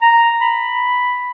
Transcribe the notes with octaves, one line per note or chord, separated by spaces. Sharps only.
A#5
B5